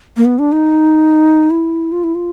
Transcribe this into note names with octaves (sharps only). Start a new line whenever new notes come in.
A#3
B3
D4
D#4
E4
F4
E4
F4